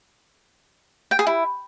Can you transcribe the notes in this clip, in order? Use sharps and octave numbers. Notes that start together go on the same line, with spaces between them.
G5
G#4
E4